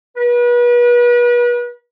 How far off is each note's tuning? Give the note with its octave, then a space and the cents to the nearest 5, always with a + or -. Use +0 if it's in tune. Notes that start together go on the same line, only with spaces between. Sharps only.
B4 -35